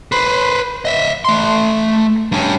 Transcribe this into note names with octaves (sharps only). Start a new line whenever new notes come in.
B4 C5
D#5 E5
A3 C6
G2 C#4